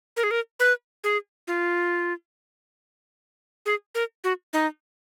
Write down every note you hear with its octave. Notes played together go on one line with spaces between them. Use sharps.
A#4
G#4
A#4
B4
G#4
F4
G#4
A#4
F#4
D#4